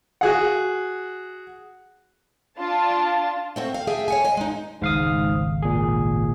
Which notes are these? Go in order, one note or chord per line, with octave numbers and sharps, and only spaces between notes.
F#4 G#4 F#5
D4 F4 A5
A3 C4 F#4
F5
A3 G#4 E5 G5
C#5 F5 G#5
D#5 G#5
G#3 D#4
G#1 C#2 G#2 F5 D#6
A#2 G#4